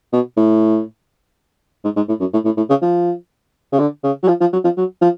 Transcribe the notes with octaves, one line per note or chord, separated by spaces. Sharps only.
B2
A2
G#2
G#2
A2
F#2
A2
A2
A2
C#3
F3
C#3
D3
C#3
F#3
F3
F3
F#3
F3
F#3
F3